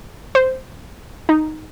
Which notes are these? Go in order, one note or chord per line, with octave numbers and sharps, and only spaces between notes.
C5
D#4